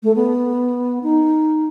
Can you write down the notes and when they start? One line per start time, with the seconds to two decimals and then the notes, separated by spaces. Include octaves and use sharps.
0.02 A3
0.15 B3
1.03 D#4